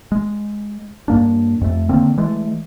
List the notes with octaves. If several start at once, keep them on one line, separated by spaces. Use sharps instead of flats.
G#3
G2 A#3 D4
F2 A3
D3 D#3 A#3 C4
E3 G#3 A3